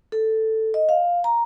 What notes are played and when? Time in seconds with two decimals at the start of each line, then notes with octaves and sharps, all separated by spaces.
0.12 A4
0.74 D#5
0.89 F5
1.24 A#5